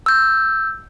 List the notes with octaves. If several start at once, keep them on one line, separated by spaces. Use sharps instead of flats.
E6 G6